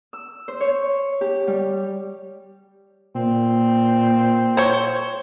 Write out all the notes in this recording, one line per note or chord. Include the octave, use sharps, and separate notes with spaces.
E6
C5
C#5
G4
G3
A#2 C4
C5 C#5